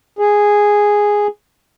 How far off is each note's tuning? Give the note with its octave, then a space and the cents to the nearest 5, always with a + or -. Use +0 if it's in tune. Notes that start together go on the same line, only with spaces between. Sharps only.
G#4 -5